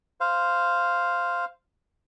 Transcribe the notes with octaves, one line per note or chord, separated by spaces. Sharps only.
C5 F5